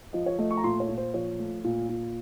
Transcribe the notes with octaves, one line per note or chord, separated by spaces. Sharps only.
F3 D#5
C#5
A3 D#5
C#6
A#5
A#2 C6
C#5
A#2
C5
F3 C#5
A3
A#2
A#2